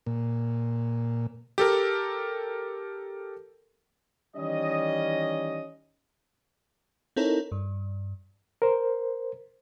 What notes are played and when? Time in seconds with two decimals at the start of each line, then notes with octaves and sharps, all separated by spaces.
0.07 A#2
1.58 G4 A4 A#4
4.36 D#3 E3 G3 C#4 D#5
7.16 C4 D#4 E4 A4 A#4 C#5
7.52 G2
8.62 A#4 C5